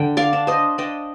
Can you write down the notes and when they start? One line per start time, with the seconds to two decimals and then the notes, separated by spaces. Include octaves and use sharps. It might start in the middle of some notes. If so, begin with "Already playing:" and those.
Already playing: D3 G5
0.17 D5 F5
0.33 D4
0.47 C5 D#5
0.78 D4 D#5 G5